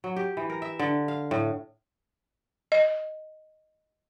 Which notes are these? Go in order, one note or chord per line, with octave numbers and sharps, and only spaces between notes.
F#3
G4
E3
A#4
E5
D3
F5
A2
D#5